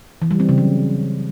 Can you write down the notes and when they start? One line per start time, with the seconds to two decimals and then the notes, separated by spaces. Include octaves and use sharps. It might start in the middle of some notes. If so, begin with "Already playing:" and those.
0.22 E3
0.31 G3
0.40 C4
0.49 C#3
0.58 F#3